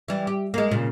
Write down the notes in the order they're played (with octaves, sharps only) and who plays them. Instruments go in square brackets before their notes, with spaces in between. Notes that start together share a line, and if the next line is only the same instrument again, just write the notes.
[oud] E3 G3
G4
G#3 A#3
A#2 C#3